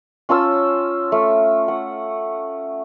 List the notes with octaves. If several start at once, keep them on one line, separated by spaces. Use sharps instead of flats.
C#4 F4 A5 E6
A3
F#5